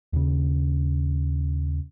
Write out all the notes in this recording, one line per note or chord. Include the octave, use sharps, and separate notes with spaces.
D#2 C#3